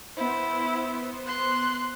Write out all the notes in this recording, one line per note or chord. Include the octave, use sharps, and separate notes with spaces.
B3 E4 C5
C6 F#6